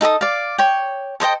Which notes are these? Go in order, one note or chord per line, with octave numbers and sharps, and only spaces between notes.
D#4 A4 G5 D#6
D5 F5
C#5 G5
A4 C5 D#5 G5